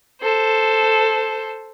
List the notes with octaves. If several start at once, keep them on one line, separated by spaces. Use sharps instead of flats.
A4 C5